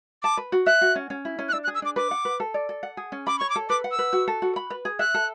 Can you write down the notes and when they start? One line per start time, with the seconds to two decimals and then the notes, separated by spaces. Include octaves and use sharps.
0.23 A5 D6
0.37 B4
0.52 F#4
0.66 E5 F#6
0.81 F#4
0.95 C#4
1.10 C#4
1.25 E4
1.39 C#4
1.49 F#6
1.53 D4 E6
1.64 F#6
1.67 G#4
1.75 E6
1.82 D4 D6
1.96 B4 D6
2.11 F#5
2.25 B4
2.40 A4
2.54 D5
2.69 A4
2.83 F#5
2.97 G#4
3.12 C#4
3.27 B5 D6
3.39 C#5 C#6
3.50 D6
3.56 A4
3.69 B4 D6
3.84 F#5
3.91 E6
3.99 B4
4.13 F#4
4.28 A4
4.42 F#4
4.56 B5
4.70 B4
4.85 G#4
4.99 E5 F#6
5.14 A4